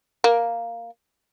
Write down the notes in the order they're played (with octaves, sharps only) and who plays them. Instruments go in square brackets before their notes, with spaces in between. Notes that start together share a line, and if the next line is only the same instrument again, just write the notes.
[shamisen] A#3